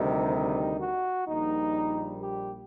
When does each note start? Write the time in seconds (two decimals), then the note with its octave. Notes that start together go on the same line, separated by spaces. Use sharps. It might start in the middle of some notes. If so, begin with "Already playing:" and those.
Already playing: D2 C3 D#3 G3 D#4
0.34 D#4
0.81 F#4
1.28 A#1 A#2 G3 D#4
2.23 G4